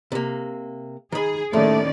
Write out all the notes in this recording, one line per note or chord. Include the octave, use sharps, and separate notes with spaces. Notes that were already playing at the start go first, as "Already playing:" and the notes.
C3 A#3
D#3 G#4 B5
D#2 A2 D#3 F3 A3 C#4 D5